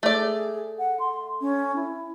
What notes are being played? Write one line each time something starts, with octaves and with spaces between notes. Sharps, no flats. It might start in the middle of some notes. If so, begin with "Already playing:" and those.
A3 G#4 D5
F#5
C6
C#4
E4